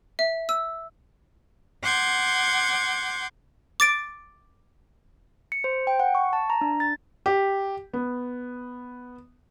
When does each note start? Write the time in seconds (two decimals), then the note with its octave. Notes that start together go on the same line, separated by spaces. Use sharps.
0.19 E5
0.49 E6
1.82 F#5 C6 D6 G6 G#6
3.80 D6 A6 D7
5.52 C#7
5.64 C5
5.87 G5
6.00 F#5
6.15 C#6
6.33 A5
6.50 A#5
6.61 D4
6.80 A6
7.26 G4
7.93 B3